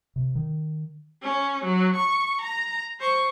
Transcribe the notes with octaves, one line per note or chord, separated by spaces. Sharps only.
C3
D#3
C#4
F#3
C#6
A#5
C5 C#6